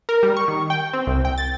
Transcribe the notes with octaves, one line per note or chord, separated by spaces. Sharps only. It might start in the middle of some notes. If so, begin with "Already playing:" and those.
A#4
G3
C#6
D#3
G5
C4
C2
G5
A6